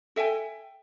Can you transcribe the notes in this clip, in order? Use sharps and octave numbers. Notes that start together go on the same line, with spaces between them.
A4 E5 G5 G#5